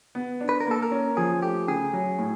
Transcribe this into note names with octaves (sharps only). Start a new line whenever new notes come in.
B3
D4
B4
A#4
A#3 A4
A#4
C#4
F3 G#4
A3 G4
C#3 G#4
F#3
A2